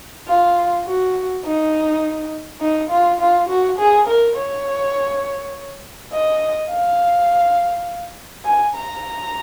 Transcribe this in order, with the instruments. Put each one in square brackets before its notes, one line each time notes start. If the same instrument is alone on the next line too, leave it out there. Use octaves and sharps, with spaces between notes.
[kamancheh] F4
F#4
D#4
D#4
F4
F4
F#4
G#4
A#4
C#5
D#5
F5
G#5
A#5